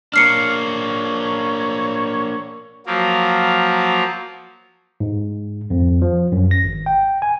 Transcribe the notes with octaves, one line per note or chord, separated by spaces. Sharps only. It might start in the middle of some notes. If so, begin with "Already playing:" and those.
A#3 D4 C#5 F6 C7 C#7
F3 F#3 A#3
G#2
F2
F3
F#2
A#6
G#1
G5
G#5